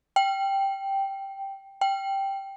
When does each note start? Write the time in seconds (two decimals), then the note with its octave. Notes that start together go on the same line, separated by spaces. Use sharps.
0.16 G5
1.81 G5